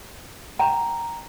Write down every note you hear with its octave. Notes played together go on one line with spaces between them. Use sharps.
G5 A#5